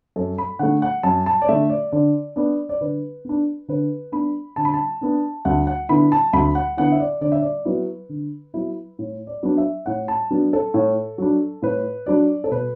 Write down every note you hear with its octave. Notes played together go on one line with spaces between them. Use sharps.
F#2 A4
B5
D3 A3 F#5
F#5
F#2 A5
A5
D5
D3 A3 E5
D5
D3 D5
B3 D4 D5
D5
D3 B4
B3 D4
D3 B4
B3 D4 B5
D3 A5
B5
A5
B3 D4
D2 F#5
F#5
D3 B3 E4 B5
A5
D2 B5
F#5
D3 B3 E4 F#5
E5
D5
D3 D5
E5
D5
F#3 B3 E4 B4
D3
F#3 B3 E4
A2
D5
F#3 B3 D4
E5
A2 F#5
A5
F#3 B3 D4
A4
A2
F#3 D4
A2 B4
F#3 D4 D5
A4
B2 B4